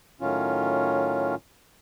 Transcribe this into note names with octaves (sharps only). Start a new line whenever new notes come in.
A2 D#3 F#3 C#4 F4